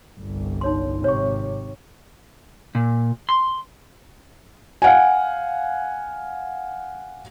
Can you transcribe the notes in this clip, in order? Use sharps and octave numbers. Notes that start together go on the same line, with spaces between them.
G1 C2
D#4 C#5 C6
G#1 C3 C#5 C#6
A#2
C6
F5 F#5 G#5